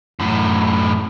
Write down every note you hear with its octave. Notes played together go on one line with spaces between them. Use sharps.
F#2 A2